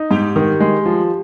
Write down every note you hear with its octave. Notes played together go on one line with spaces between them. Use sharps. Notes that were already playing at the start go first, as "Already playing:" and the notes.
Already playing: D#4
G#2 G4
D#3
G#3
F3